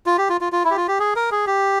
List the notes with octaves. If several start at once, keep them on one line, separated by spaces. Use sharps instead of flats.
F4
G4
F4
F4
F4
E4
G4
F4
G4
G#4
A#4
G#4
G4